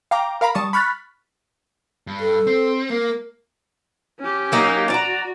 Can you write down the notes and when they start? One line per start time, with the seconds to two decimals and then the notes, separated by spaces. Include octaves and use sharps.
0.11 F5 G5 A#5 D6
0.41 A#4 F5 A#5 B5
0.55 G3 A5 C#6 D#6
0.73 B5 C#6 F6 F#6 A6 B6
2.07 G2
2.20 A4
2.47 C4
2.91 A#3 A#4
4.20 C#4 G4
4.52 F#3 A#3 D#4
4.90 F#4 D5 A#5